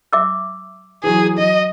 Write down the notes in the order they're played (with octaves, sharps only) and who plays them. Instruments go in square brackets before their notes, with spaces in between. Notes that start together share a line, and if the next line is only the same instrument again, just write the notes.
[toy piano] E5 D6 E6
[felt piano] E3 F#3 [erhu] G#4
[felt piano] F#3 [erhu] D#5